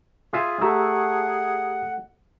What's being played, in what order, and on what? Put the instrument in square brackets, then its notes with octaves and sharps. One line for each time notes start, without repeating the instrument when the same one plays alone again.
[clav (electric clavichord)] F4 E5 G#5 [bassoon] G#4
[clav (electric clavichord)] A3 [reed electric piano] G4 A#5 E6 [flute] F#5